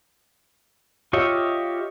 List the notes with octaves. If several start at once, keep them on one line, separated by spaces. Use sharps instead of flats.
F4 G4 C#5 D#5 E5